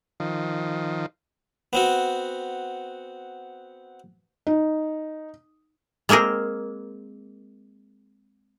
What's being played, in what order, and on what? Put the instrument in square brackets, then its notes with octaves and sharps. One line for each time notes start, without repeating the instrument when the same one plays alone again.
[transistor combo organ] D#3 F3
[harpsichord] B3 C4 F#4
[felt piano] D#4
[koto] G#3 A#3 C4 G#4 A#4